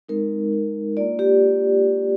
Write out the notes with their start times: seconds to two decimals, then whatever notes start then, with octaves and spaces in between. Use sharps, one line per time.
0.09 G#3 C4 D#4 A#4
0.52 G#3 D#4
0.97 A#3 D4 F4 D5
1.19 G4